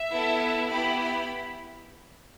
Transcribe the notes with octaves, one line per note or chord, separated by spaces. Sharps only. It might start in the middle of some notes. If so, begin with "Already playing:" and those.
Already playing: E5
B3 E4 A4
B3 E4 G4 B5
B5